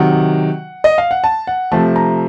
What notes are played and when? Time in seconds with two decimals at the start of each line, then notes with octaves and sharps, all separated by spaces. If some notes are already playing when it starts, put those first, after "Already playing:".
Already playing: C3 D#3 F#3 F#5
0.84 D#5
0.98 F5
1.11 F#5
1.24 A5
1.47 F#5
1.72 C3 F3 A3 A5
1.96 A#5